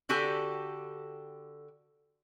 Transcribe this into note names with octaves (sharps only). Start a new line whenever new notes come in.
D3 F#4 G4 A4 G#5